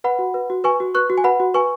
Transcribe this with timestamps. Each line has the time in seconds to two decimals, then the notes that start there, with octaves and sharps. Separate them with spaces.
0.04 B4 F#5 B5
0.19 F#4
0.34 B4
0.50 F#4
0.64 B4 G#5 C#6
0.80 F#4
0.95 B4 C#6 F#6
1.10 F#4
1.18 G#5
1.24 B4 F#5 B5
1.40 F#4
1.54 B4 G#5 C#6